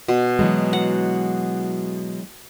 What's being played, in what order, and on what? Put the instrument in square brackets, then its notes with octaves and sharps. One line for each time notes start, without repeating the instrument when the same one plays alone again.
[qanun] B2
[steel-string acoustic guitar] E3 F#3 G#3
[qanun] F#5